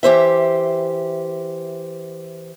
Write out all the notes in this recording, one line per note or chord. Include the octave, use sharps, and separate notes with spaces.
E3 G4 C5 E5